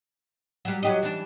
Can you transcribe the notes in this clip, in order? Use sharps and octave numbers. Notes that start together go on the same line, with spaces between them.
F#3 G3
F#3 G4 D#5
E3 D4